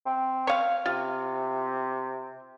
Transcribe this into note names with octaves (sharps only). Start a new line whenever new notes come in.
C4
C#5 F5
C3 F4